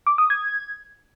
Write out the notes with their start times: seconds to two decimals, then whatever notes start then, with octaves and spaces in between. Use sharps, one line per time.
0.07 D6
0.18 D#6
0.30 G#6